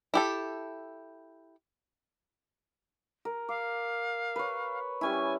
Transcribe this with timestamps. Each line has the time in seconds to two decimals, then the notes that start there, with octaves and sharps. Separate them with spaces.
0.14 E4 G4 A4
3.25 A#4
3.49 F5 D6
4.36 B4 C#5
5.01 G3 C#4 E4 G#5